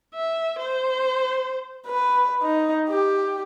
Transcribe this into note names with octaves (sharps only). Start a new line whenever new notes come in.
E5
C5
B4
D#4
G4